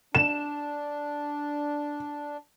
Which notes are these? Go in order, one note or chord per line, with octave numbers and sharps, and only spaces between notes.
D4 E7